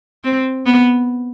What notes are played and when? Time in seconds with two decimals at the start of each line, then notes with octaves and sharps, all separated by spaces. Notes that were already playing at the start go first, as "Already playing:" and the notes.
0.24 C4
0.66 B3